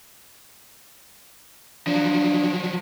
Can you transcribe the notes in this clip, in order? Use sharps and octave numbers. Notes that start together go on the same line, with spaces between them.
F3 F#3 D4